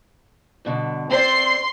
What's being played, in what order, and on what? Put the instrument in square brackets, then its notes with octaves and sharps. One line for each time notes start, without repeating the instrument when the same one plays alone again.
[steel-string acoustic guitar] G2 B2 D3
[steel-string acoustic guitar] C4 C5 D5 [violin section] C6 C7